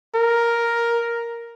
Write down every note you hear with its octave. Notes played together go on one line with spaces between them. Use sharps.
A#4